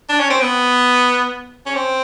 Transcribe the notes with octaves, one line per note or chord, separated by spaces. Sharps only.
D4
C#4
C4
B3
C#4
C4